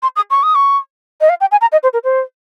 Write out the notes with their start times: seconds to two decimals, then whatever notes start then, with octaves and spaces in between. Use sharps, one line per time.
0.03 C6
0.16 D#6
0.31 C#6
0.43 D#6
0.55 C#6
1.21 D#5
1.29 F5
1.41 G5
1.51 G#5
1.61 A#5
1.72 D#5
1.83 C5
1.93 A#4
2.04 C5